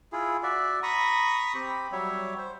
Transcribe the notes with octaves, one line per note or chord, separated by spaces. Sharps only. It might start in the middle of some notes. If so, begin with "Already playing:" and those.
E4 F4 G#4
F#4 D5 E5
A#5 B5 C#6 D#6
C4 G4 B5
F#3 G3 C#5 E5
C5